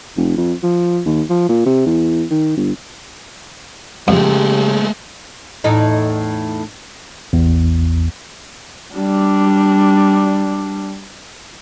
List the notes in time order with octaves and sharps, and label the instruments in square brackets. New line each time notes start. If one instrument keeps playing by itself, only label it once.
[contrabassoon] F1
F2
F3
D#2
F3
A#2
C3
E2
D#3
G1
[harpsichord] F2 [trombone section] C#3 [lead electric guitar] G#3 A3 [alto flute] G4
[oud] E2 A2 D#4
[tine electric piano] A1 E2
[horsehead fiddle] G3 D4